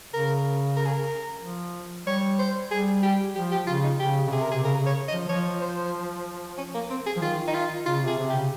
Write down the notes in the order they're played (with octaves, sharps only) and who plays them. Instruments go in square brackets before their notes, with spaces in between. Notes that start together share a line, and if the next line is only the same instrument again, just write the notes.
[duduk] C#3 [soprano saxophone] A#4
[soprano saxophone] A#4
G#4
A#4
[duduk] F3
[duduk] G3 [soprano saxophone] C#5
[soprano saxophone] C5
[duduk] G3 [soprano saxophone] G#4
[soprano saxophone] G4
[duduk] F3 [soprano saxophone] G4
[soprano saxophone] G4
[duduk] C#3 [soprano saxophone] F4
[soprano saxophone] D#4
[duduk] C#3 [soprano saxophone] G4
[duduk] C#3
[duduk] C3 [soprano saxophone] G#4
[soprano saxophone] A#4
G#4
[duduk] C3
[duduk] C#3 [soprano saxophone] A#4
[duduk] C#3
[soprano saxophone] C#5
D#5
[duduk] F3
[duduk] F3 [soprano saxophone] C#5
[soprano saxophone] C5
C#4
A#3
C4
G#4
[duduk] F3
[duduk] D#3 [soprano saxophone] F4
[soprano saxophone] D#4
F4
[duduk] C#3 [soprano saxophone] F4
[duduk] C3
[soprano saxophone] G#4
[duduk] C3
[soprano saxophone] G4
[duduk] C#3